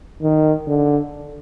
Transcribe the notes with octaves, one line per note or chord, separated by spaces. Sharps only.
D#3
D3